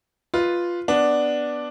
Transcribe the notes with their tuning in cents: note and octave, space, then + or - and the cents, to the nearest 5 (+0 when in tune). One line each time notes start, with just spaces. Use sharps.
F4 +0 B4 +0 D#5 +15
B3 +0 D4 +0